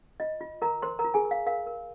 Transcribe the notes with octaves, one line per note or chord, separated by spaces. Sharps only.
F4 D#5
F4
F4 A#4 A#5
A#4 C5 C6
A#4 A#5
F4
G#4 G#5
A#4
F5
A#4 F5
A#4